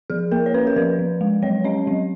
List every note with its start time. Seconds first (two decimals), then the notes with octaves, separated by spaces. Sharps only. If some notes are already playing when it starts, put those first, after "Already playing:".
0.10 F3 G#4
0.31 A#3 A#4
0.46 C#5
0.54 C#4 B4
0.67 A#4
0.76 F3 B4
0.99 F3
1.21 G#3
1.42 F#3 C#5
1.64 C#4 D#5
1.87 F#3